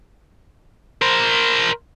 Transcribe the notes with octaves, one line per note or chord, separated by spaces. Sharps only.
A#4 C5